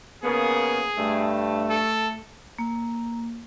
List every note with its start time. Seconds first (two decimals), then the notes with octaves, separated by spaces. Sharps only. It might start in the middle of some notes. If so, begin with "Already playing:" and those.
0.24 C#3 A#3 B3 G#4
0.97 G2 A3
1.70 A4
2.58 A#3